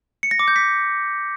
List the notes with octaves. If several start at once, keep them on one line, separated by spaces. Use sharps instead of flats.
C#7
A#6
D6
G6
B6